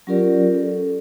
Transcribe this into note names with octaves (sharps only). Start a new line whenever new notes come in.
F#3 C#4 F4 G4 A#4 D5
A4